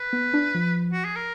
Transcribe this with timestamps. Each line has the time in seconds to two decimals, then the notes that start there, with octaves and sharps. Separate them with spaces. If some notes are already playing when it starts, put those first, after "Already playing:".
Already playing: B4
0.13 B3
0.33 D4
0.54 F3
0.92 F#4
1.05 G#4
1.16 A#4